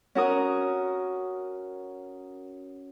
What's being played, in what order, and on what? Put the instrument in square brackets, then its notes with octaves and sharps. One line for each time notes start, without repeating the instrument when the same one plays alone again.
[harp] C#4 F#4 A#4 D#6